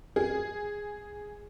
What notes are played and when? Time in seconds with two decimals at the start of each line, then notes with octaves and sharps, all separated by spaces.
0.16 G#4